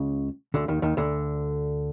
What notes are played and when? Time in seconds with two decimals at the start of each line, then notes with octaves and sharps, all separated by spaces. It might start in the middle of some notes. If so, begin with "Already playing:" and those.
Already playing: C#2 C#3
0.54 D2 D3
0.68 D#2 D#3
0.82 D#2 D#3
0.97 D2 D3